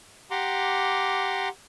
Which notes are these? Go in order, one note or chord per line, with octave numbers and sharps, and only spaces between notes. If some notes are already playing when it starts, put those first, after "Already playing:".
G4 F#5 A#5 C6 D6